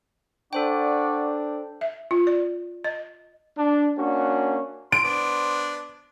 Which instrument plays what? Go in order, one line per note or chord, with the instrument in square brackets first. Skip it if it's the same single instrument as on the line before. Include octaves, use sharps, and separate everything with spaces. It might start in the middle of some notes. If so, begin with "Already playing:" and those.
[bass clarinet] D4 [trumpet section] F#4 D5 [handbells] A4 C5 G5
[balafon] E5
F4
D5
D#5
[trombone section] D4
A#3 C#4 D4 F#4
[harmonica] C6 [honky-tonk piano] D7
[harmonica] B3 D4 C5